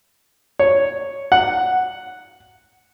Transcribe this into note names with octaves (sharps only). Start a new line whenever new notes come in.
C#5
F#5